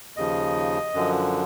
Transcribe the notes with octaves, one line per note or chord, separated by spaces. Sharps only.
D#2 C#3 F3 D#5
F#2 D3 F3